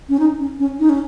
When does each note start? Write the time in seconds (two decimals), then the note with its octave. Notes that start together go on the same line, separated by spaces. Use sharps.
0.09 C#4
0.19 D#4
0.40 C#4
0.60 C#4
0.79 D#4
0.89 C#4